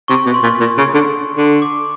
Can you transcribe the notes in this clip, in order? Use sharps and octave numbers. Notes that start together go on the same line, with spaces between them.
C3 C#6
B2
C6
A#2
A#2
C#3
D3
D3
D6